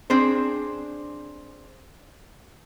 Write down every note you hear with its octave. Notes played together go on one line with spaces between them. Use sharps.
C4 D4 G#4 C5